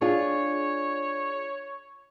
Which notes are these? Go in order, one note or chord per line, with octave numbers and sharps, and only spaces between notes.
D4 F4 G#4 C#5